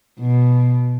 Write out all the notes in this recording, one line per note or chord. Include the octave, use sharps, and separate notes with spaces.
B2